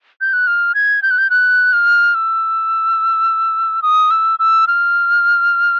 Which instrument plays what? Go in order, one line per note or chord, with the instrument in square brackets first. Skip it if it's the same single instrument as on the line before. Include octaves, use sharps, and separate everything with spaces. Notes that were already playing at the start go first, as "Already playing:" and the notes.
[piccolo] G6
F#6
F6
G#6
G6
F#6
G6
F#6
F6
E6
D#6
E6
E6
F6